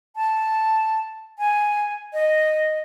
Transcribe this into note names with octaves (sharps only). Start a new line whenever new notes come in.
A5
G#5
D#5